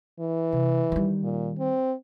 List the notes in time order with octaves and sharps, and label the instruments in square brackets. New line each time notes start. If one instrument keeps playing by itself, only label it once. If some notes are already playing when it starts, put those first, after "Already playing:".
[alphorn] E3
[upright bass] C3
D#3 G3
[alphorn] A#2
C4